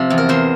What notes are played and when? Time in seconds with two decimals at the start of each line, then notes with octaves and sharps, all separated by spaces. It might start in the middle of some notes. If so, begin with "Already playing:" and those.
Already playing: C3 F3
0.10 E2
0.18 A#4
0.29 E2 C5